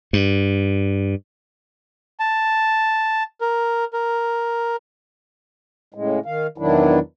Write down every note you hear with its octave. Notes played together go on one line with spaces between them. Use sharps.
G2
A5
A#4
A#4
A2 C#3 G#3
D#3 F5
E2 B2 D#3 F#3 D4 E4